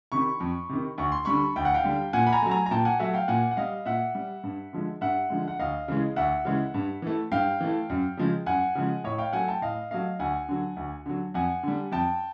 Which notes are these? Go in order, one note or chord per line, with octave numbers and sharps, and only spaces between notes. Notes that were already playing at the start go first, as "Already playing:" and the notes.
C3 D#3 B5 C#6
F2
C3 D#3
D2 C#6
C6
D3 G3 B5 C#6
D2 G5
F#5
F5 G5
D3 G3
A#2 F#5 G#5
B5
G#5 A#5
F#3 A3
G#5 A#5
A#5
A#2 G5 A5
F#5 G#5
F#3 A3 E5 F#5
F5 G5
A#2 F#5 G#5
F#5
G3 D#5 F5
A#2 E5 F#5
G3
G2
D3 F3 G#3
G2 E5 F#5
D3 F3 G#3
F#5
D2 D#5 F5
C#3 E3 G#3
D2 E5 F#5
C#3 E3 G#3
G2
E3 A3
G2 F5 G5
E3 A3
F#2
C#3 F3 G#3
F#2 F#5 G#5
C#3 F3 G#3
A2 C#5 D#5
F5 G5
F#3 A3 F#5 G#5
G5 A5
A2 D#5 F5
F#3 A3 D#5 F5
D2 F#5 G#5
D3 F#3
D2
D3 F#3
F2 F#5 G#5
D3 G3
F2 G5 A5